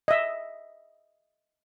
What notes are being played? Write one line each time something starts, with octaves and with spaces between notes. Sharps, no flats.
D#5 E5